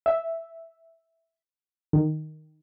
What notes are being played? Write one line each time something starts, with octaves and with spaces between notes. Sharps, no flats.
E5
D#3